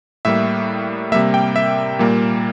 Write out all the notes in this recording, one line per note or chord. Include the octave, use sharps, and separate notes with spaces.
A2 G3 A#3 E5
C3 G3 A#3 E5
G5
E5
A#2 G3 A#3